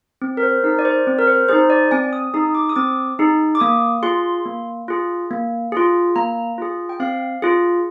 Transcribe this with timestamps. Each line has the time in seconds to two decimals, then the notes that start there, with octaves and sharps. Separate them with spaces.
0.22 C4
0.37 A#4
0.43 C5
0.64 D#4 G#4 A#4
0.79 D5
0.85 C5
1.07 C4
1.19 A#4
1.27 C5
1.48 D#4 G#4 C5
1.70 D5
1.91 C4 G#5
2.13 D#6
2.34 D#4 G#4 D#6
2.55 D6
2.69 D#6
2.76 C4 D6
3.19 D#4 G#4
3.55 D6
3.60 A#3 D#6
4.03 F4 G#4 C6
4.45 A#3
4.88 F4 G#4
5.31 A#3
5.72 F4 G#4
6.16 A#3 A#5
6.58 F4 G#4
6.89 G5
7.00 C4 F5
7.42 F4 G#4